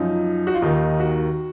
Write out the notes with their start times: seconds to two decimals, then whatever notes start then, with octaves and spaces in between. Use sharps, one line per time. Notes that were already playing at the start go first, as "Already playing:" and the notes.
Already playing: F#2 F3 D#4
0.47 F#4
0.54 F4
0.62 D#2 D#3 D#4
1.00 F#4